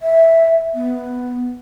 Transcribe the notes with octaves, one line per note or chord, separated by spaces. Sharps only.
E5
B3